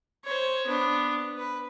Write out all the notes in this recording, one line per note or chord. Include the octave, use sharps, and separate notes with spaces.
C5 C#5
B3 D4
B4